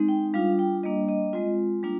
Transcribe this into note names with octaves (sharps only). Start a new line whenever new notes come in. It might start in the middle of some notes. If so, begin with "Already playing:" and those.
Already playing: G#3 C4 D#4
G5
G3 D4 F4 F5
G5
G3 A#3 D4 D#5
D#5
G#3 C4 F4
G3 A#3 D4 F4